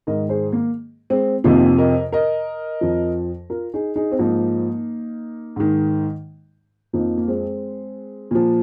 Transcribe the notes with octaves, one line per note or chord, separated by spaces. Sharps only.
G#2 D#3 A#4 D#5
G#4 C5
A#3
G#3 C4
F2 C3 F3 A#3 D#4
A#4 D#5
A#4 D#5
F2 F3
F4 A#4
D#4 G#4
D#4 G#4
C4
G#2 F3 A#3 D#4
G#2 D#3
F2 F3 A#3 D#4
A#3
G#3 C4
A#2 F3